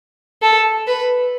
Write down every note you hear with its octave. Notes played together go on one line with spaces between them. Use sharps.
A4
B4